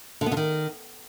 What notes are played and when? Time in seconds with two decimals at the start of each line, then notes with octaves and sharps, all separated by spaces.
0.21 D3
0.26 B3
0.32 D3
0.37 D#3